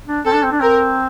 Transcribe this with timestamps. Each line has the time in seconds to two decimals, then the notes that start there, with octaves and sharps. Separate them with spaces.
0.08 D4
0.26 C4 A4
0.34 D4
0.43 C4
0.52 D4
0.61 C4 A#4